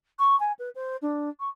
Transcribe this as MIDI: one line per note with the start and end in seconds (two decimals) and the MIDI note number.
0.19 0.38 85
0.40 0.52 80
0.59 0.70 71
0.75 0.97 72
1.02 1.29 62
1.40 1.49 85